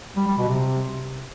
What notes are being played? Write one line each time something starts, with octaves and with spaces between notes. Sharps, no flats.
G3
G3
B2
C3